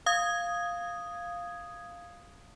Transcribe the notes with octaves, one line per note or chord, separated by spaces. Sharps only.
F5 D#6 G#6